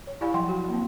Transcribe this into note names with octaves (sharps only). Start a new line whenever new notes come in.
C#5
E4 G4 D5 F5 G#5 B5
F3 F#3 F#5 G5 C6
F#4
A#3 C4